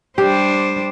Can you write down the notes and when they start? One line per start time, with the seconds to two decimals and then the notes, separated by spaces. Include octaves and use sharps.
0.18 G3 D4 G4 C5